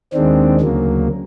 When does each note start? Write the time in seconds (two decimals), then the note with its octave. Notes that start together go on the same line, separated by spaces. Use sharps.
0.13 D#2 D#3 G#3 C4 D4
0.61 D2 C#3 F#3 A#3